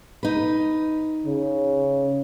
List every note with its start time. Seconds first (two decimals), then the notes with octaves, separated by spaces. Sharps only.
0.23 D#4 B4
1.26 C#3